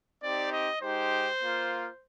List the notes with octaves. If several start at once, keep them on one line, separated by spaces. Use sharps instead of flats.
C4 D#4 G4 D5
D#5
G#3 D#4 G4 C5
A#3 F4